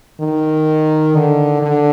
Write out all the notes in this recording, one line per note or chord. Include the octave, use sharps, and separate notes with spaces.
D#3
D3
D3